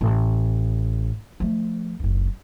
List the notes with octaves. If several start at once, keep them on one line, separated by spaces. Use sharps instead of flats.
A1
F3 A3
F#1 D2